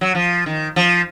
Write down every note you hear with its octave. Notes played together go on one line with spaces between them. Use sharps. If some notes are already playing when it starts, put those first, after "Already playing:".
F#3
F3
D#3
F3